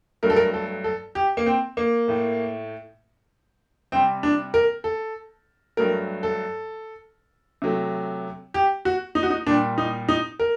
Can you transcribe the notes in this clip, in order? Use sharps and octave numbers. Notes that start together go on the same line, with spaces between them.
G2 F#3 A3 A#4
A4
A#4
A4
A4
G4
A#3
C4
A#3
A2 A3
C3 G3 C4
D4
A#4
A4
G2 F#3 A3 A#4
A4
C3 F#3 A3
G4
F#4
D#4
F#4
D#4
A#2 G3 D4
D#4
D#4
A#4